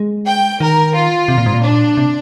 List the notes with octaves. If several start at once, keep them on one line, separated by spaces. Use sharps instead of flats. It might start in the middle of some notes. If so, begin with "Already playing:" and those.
Already playing: G#3
G5
D#3 A#4
F4
C3
A#2
G#2
A#2
D4
C3